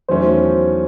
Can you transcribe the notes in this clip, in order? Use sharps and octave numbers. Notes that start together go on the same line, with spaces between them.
E2 D#3 F#3 A3 C#4 C5